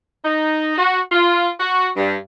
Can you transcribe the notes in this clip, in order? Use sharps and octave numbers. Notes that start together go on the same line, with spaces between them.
D#4
F#4
F4
F#4
G2